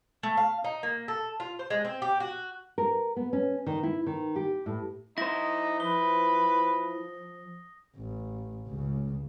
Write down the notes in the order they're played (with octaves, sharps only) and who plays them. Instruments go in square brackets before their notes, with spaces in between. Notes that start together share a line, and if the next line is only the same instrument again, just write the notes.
[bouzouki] A3
F5
D#4
A#3
A4
F4
C5
G#3
C4
G4
F#4
[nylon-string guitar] A#4
B3
C#4
D#3
E4
D#3
G4
A2
[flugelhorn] D#4 [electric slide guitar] E4 C5 [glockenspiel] A#6
[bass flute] F3 [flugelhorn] B4 [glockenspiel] D#6 G7
[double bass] A1
C#2 C#3